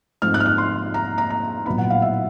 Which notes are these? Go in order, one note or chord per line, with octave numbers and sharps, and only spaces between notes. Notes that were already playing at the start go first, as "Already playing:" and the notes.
G#2 F3 A3 C4 F6
F#6
F6
F#6
C6
A#5
A#5
A#5
A#1 A2 F#3 B3 B5
F#5
F5
E5